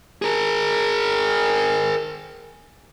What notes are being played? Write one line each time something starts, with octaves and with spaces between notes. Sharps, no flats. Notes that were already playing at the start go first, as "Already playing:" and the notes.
G#4 A#4